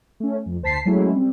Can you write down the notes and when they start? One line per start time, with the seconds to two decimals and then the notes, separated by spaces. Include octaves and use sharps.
0.20 A3 C#4
0.46 F2
0.62 D2 C5 A5 B6 C7
0.85 F#3 G#3 A3 C#4 E4
1.12 G3 C4